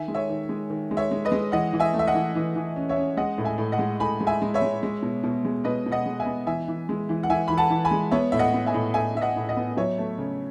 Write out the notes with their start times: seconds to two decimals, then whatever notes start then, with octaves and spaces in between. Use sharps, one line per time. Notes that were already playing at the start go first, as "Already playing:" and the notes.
Already playing: D#3 E5 G#5
0.08 G#3
0.14 C#5 E5
0.29 D#3
0.49 G#3
0.70 D#3
0.91 G#3
0.97 C#5 E5
1.11 G#3
1.25 B4 D#5
1.32 G#3
1.52 E3 D#5 F#5
1.73 E3
1.80 E5 G#5
1.94 A3
1.99 E5
2.07 D#5 F#5
2.15 E3
2.35 E3
2.56 E3
2.76 C#4
2.89 C#5 E5
2.97 C#4
3.17 G#3 D#5 F#5
3.38 A2
3.44 E5 G#5
3.58 A2
3.72 D#5 F#5
3.79 G#3
4.00 A2 G#5 B5
4.20 G#3
4.27 E5 G#5
4.42 G#3
4.54 C#5 E5
4.62 G#3
4.83 G#3
5.02 B2
5.23 B2
5.45 G#3
5.64 B2 B4 D#5
5.86 B2
5.92 D#5 F#5
6.06 G#3
6.20 E5 G#5
6.26 B3
6.47 E3 E5 G#5
6.68 E3
6.89 G#3
7.09 E3
7.23 F#5
7.30 E3 E5 G#5
7.48 E3 B5
7.57 F#5 A5
7.70 E3
7.85 G#5 B5
7.91 G#3
8.11 B3 C#5 E5
8.32 A2 E5
8.39 D#5 F#5
8.54 B3
8.66 E5 G#5
8.74 A2
8.94 A2 E5 G#5
9.15 A2 E5
9.21 D#5 F#5
9.36 A2
9.49 D#5 F#5
9.57 B3
9.77 F#3 C#5 E5
9.98 A3
10.18 C#3